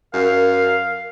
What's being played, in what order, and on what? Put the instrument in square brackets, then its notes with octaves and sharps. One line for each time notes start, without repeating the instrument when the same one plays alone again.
[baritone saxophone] F#2 [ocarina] A#4 [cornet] F5